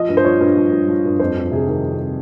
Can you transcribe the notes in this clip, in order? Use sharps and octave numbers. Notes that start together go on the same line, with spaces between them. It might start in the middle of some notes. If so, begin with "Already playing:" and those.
Already playing: F3 D#5
G2
C5
F3 C#5
G2
F3
G2
F3
G2
F2 C5
F2
C3 G#4
D#3
F2